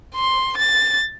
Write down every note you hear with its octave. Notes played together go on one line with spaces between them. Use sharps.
C6
A6